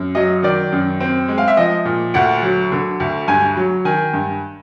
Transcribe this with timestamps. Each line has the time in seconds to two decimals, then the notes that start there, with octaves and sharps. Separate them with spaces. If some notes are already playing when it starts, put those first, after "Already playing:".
Already playing: F#2
0.15 F#3 D#5
0.43 D#3 D5
0.72 F#2
1.00 C4
1.28 G#3
1.38 F5
1.48 E5
1.57 F3 D#5
1.85 A#2
2.14 D2 F#5
2.42 F#3
2.72 D3
3.00 D2
3.28 G2 G#5
3.57 F#3
3.85 D#3 G#5
4.13 G2